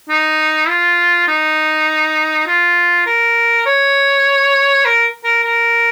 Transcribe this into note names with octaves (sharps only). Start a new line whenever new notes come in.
D#4
F4
D#4
F4
A#4
C#5
A#4
A#4
A#4